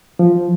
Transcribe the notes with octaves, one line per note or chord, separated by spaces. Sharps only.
F3